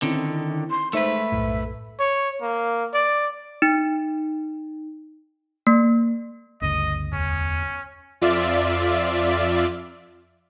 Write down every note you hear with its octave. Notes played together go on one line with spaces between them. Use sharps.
D3 D#3 C4 C#4 E4
C6
G#3 A3 D#4 B4 C5 E5
B1 F#2 A2
C#5
A#3
D5
D#4
A#3
G1 D2 C#3 D#5
E2 C#4
F2 F4 D5 E5